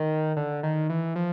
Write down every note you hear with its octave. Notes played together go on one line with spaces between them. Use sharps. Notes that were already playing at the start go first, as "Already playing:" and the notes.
Already playing: D#3
D3
D#3
E3
F3